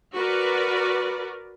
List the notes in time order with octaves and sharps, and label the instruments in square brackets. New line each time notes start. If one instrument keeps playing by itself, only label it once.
[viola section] F#4 A#4 B4 D5